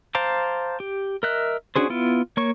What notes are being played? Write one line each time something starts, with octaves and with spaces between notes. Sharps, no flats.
C5 F5 A5 A#5 D6
G4
A#4 D#5 E5 F#6
C#4 D4 F#4 G#4 C5
B3 E4 F4
A#3 C#5 C#6